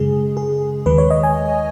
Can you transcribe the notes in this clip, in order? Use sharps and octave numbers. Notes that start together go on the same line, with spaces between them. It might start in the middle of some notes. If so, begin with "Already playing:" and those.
Already playing: F#2 C#3 G#3 G#4
G#4
D#2 D#3 G#3 B4
C#5
D#5
G#5